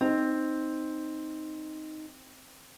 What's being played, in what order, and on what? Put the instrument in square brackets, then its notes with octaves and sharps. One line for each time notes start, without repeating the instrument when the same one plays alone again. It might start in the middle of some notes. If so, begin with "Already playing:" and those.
[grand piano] C4 [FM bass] D#4